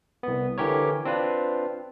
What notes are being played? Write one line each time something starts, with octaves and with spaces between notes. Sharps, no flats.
C2 B3
D3 E3 G4 A#4 C#5
C4 D4 F4 B4